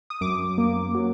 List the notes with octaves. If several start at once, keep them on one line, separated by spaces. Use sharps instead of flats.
D#6
F#2 D6
A#3
F#3